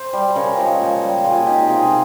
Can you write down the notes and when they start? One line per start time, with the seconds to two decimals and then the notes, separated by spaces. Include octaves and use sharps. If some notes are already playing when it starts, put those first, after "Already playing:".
Already playing: C5
0.13 G3
0.35 C#3 A#4 C#5
0.58 F3 G#3
0.80 A#2
1.02 G3
1.24 A#2 F4 G#4
1.46 G#3 D#4 G4
1.68 C3 F4 G#4
1.83 F4 G#4